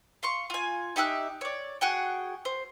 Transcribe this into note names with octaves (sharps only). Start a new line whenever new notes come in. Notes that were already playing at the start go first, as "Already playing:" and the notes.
F5 C6 C#6
F4 G#5
D#4 G4 E5 F#6
C#5 D5
F#4 G#4 F#5 G5
C5